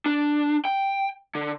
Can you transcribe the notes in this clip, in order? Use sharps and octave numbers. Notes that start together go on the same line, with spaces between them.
D4
G5
D3